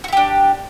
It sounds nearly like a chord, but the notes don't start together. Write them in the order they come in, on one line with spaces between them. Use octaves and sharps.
F#4 E4 G4 D4